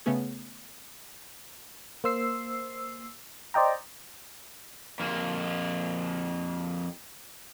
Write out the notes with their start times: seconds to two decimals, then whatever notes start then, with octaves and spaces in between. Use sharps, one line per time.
0.06 C#3 A3 B3 C#4 G#4
2.04 A#3 C5 E6 C7
3.54 C5 D5 D#5 G5 A#5
5.00 F2 A#3